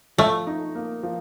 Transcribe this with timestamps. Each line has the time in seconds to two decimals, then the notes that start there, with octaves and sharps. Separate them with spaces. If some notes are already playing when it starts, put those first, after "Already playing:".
0.18 F3 A3
0.47 D#4
0.75 A#3
1.03 F3